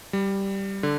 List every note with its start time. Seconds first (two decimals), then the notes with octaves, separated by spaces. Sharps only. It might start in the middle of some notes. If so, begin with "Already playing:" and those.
0.13 G3
0.83 D3